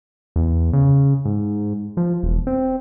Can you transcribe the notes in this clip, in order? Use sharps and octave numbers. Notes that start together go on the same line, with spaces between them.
E2
C#3
G#2
F3
E1
C4